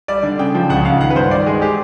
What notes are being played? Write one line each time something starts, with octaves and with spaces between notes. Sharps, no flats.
G3 D5
D3
C#3 G5
F3
C#2 F#5
C#3 F5
D#3 F#5
B4
G2 C5
D#3 D5
G#3 G#4
G4